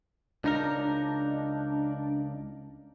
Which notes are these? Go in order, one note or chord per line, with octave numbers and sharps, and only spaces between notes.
C#2 D4 D#4 A#4